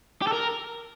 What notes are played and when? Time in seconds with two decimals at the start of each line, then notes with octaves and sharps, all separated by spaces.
0.22 G4
0.27 A4
0.33 A#4